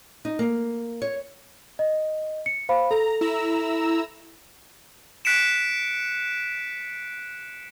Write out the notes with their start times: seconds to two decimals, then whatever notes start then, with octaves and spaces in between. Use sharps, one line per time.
0.25 D#4
0.39 A#3
1.02 C#5
1.79 D#5
2.46 C#7
2.69 C5 F5 B5
2.91 A4 A#5
3.21 E4 A#5 E6
5.25 F#6 B6 C#7 D7 E7